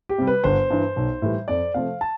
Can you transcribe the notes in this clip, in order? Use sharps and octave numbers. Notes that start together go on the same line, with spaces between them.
G4
C3 G3
B4
G1 C5
G2 E3
B1
A2 E3 G3
F2 D5
C3 F3 A3 F5
A5